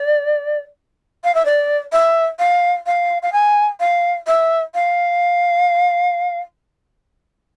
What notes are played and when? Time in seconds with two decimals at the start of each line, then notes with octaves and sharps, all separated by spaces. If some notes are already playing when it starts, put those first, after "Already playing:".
Already playing: D5
1.24 F5
1.35 E5
1.45 D5
1.92 E5
2.39 F5
2.86 F5
3.22 F5
3.32 G#5
3.80 F5
4.27 E5
4.75 F5